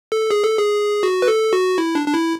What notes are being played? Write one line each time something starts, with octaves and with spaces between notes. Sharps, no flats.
A4
G#4
A4
G#4
F#4
B4
A4
F#4
E4
D4
D4
E4